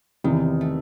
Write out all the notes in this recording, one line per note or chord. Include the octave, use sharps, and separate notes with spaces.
E2 C3 D#3 E3
A3